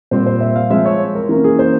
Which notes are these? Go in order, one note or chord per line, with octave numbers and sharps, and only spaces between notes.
A#2 G3 C4 C5
C5
E5
F5
F3 G#3 C4 E5
C#5
A#4
E3 A#3 C#4 A#4
G#4
C5